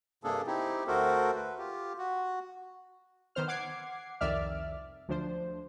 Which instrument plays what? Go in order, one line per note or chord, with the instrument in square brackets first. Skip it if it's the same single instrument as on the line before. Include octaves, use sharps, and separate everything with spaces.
[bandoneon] G2 C3 A#3 D4 G#4 A4
C4 D#4 E4 G4
D2 A3 F#4 A4 A#4 C5
B4
F4 G4
F#4
[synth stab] D#3 B3 C5 F6
F#5 D6 G#6 C7
C2 F2 D#3 D5 E5 F6
D2 F3 D4 C5